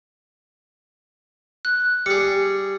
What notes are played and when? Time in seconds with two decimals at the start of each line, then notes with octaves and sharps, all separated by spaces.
1.65 F#6
2.06 G3 G#4 C#7